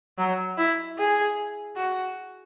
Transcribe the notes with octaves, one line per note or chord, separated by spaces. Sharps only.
F#3
E4
G#4
F#4